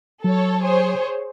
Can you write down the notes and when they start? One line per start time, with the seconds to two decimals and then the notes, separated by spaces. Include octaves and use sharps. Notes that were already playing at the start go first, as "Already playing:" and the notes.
0.24 F#3 A4 C#5
0.62 G#4 C5 C#5